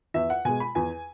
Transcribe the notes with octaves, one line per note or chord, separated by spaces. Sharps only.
E2 E5
F#5
B2 G#3 G#5
B5
E2 G#5